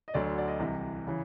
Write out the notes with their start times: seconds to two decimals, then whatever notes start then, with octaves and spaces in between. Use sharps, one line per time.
0.08 D#5
0.14 D2 D3 F#3 D5
0.26 D5
0.38 D5
0.48 D#5
0.59 C2 C3 E3
1.07 C#3 E3